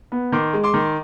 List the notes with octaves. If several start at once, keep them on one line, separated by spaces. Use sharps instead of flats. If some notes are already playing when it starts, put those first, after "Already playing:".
B3
D#3 C6 D6
G#3
C6 D6
D#3